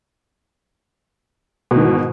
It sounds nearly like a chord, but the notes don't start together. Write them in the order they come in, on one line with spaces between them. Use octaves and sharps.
B2 D#3 E3 G#2